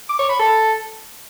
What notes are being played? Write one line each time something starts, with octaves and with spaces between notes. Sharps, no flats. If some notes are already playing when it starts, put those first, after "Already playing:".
D6
C#5
B5
A4